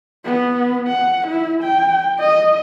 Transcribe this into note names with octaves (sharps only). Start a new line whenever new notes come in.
B3
F#5
E4
G5
D#5